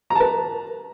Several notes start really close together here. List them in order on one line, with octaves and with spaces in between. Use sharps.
A#5 A5 B4